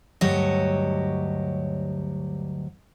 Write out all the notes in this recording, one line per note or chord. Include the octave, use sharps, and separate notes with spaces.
D2 G2 F#3 G4 C#5 D#5